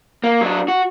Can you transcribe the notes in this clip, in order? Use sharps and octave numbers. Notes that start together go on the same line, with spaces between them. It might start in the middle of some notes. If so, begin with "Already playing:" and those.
A#3
F#3 D4
F#4